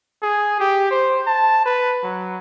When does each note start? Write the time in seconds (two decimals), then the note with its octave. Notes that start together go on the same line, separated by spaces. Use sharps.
0.23 G#4
0.60 G4
0.91 C5
1.27 A5
1.65 B4
2.03 F#3